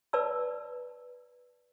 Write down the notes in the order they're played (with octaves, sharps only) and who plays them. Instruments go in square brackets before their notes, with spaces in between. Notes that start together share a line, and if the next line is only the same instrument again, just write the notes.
[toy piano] B4 D5 A5 E6